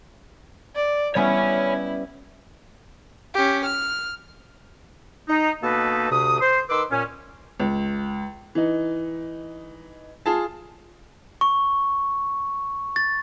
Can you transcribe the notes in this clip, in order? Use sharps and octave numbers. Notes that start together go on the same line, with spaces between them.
D5
G3 B3 C#4 E4 C#5 G#5
C#4 G4
F6
D#4
B2 A#3 D#4 A4 B4
D2 C3 D#6
C5
D#3 B4 C6 D6 E6
A#2 C#4
C#2
E3 D#4
F4 G#4 A5
C#6
A6